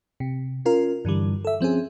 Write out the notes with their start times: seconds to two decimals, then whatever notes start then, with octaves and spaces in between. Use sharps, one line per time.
0.20 C3
0.65 C#4 F4 A#4
1.05 G2 D3 E3 G3
1.45 A4 E5
1.61 F3 C4 C#4 G#4